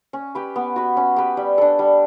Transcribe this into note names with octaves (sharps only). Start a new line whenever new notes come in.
C#4
G4 B4
B3
F#4 B4
C#4
G4 B4
G3
D4 A4
G3